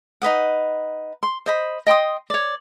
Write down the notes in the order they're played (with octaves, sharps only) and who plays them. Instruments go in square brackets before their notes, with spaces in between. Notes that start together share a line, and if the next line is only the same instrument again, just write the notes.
[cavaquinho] D#4 B4 D#5 F#5
C6
C5 D#5 B5
D#5 G5 C6 D#6
C#5 D5